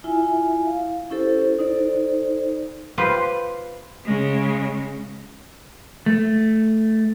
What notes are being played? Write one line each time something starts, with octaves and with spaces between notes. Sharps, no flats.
E4 F4 E5 G#5
F5
C#4 E4 G4 A4 C5
D#4 A4 C5 D5
F4 G4 B4 C5
C#3 G#3
A3